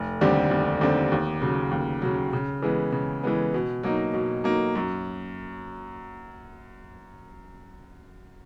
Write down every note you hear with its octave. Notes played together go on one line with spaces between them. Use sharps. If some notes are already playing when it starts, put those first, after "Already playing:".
Already playing: F1
D#2 D3 G3 C4
F1
D#2 D3 G3 C4
D#2
C#3 F#3
D#2
C#3 F#3
C#3
E3 G#3 B3
C#3
E3 G#3 B3
B2
F#3 A#3 D#4
B2
F#3 A#3 D#4
F#2